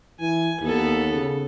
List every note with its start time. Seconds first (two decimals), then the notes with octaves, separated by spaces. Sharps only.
0.20 E3 G#5
0.61 D#2 B3 A4
1.14 C#3